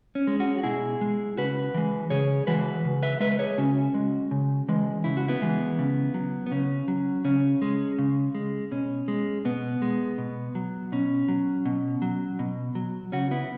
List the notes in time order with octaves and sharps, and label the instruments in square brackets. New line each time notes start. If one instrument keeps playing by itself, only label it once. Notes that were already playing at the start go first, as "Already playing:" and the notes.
[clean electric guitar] C#4
G#3
C#4 F#4
F#4
B2 E4 G#4
G#3
C#3 F#4 B4
E3 G#3
C#3 G#4 C#5
E3 G#3 F#4 B4
C#3
B4 E5
G#3 B4 E5
B4
G#4 C#5
C#3 C#4 F#4
G#3
C#3
E3 G#3
C#3 E4
F#4
B3 E4
E3 G#3
C#3
F#3
B3
C#3 C#4
F#3
C#3 C#4
G#3
C#3
G#3
B2 C#4
G#3
B2 B3
G#3
B2
F#3
B2 C#4
F#3
B2
F#3
B2
F#3
C#3 C#4 F#4
B3 E4